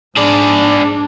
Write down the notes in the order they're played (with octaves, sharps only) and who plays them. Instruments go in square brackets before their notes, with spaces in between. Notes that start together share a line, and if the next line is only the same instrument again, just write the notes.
[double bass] G#2 D4 [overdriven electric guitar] G#4 D5